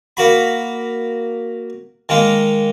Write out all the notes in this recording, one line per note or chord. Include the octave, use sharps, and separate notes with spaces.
A#3 F#4 B5
D#3 G#3 A#3